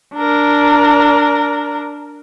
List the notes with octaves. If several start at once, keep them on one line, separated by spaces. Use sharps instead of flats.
D4 A#4